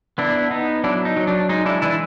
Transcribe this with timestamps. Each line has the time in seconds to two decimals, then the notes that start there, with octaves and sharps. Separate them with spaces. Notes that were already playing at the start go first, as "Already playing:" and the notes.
0.18 B3 D4 E4
0.51 B3 D#4
0.84 F#3 D4 E4
1.05 D#4
1.17 F#3
1.27 D4
1.49 G#3 D#4
1.66 D4 E4
1.82 E3 D4 E4